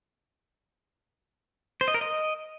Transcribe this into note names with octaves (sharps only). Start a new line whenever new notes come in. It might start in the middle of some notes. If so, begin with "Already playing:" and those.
C5
D#5
A#4
D#5